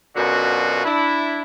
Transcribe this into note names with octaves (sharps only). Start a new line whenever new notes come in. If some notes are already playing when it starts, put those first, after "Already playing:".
F#2 B2 D3 F4 F#4
D4 E4